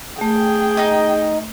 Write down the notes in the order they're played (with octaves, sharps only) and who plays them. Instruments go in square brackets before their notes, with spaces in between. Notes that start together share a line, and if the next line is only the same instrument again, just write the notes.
[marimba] A3 [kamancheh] G#4 G5
[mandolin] D#4 D#5